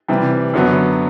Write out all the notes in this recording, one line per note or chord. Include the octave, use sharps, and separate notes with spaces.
C3 E3 G3
F#2 D3 F#3 B3